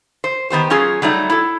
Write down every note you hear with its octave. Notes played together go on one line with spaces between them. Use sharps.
C5
D#3 B3 G4 C5
F#3 C#4 F4 G#4
F#3 G3 A3 D#4
E4 A4